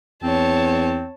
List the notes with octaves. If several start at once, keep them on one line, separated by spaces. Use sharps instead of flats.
E2 C4 C#5 A5